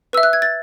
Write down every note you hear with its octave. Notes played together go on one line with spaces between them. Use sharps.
B4 E5 E6
F#6
G#6
A6